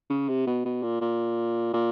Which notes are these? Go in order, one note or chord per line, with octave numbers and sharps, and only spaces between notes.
C#3
C3
B2
B2
A#2
A#2
A#2